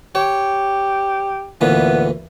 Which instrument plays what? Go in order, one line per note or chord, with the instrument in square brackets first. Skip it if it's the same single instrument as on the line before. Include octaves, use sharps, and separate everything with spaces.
[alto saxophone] G4 [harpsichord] C#5
[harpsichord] D2 A#2 E3 [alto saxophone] B3